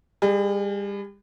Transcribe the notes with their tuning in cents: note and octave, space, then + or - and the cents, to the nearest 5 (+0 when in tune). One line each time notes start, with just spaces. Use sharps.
G3 +40 G#4 +15